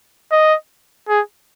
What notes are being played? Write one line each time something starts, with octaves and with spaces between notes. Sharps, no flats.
D#5
G#4